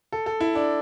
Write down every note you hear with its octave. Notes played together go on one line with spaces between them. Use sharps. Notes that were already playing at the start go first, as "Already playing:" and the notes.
A4
A4
E4
D4